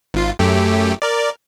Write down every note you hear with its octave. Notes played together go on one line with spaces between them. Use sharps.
G#1 F4
F#2 A3 G4
A#4 D5